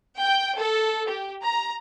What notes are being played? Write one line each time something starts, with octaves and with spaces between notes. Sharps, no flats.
G5
A4
G4
A#5